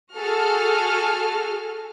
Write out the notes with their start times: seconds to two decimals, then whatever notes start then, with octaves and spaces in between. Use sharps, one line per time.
0.16 F#4 G#4 A4 F6